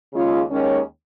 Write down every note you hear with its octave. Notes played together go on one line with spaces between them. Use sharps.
D#2 C#3 G#3 C#4 F4
D#2 D#3 G#3 C#4